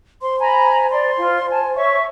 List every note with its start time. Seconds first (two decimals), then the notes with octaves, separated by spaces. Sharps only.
0.22 C5 C6
0.40 G#5 A#5 B5
0.90 D5 C6
1.16 F4
1.50 G#5 A5
1.76 C#5 E5 C#6